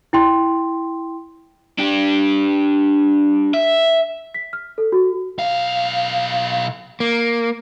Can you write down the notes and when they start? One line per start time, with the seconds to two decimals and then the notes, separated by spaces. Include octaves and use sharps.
0.13 E4 G5 C6
1.78 D4 G4
3.54 E5
4.34 B6
4.53 F6
4.78 A4
4.92 F#4
5.39 B1 F5
7.00 A#3